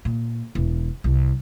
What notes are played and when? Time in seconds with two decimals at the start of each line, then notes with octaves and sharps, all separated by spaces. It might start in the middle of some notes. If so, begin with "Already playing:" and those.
0.05 A#2
0.55 E1
1.04 C2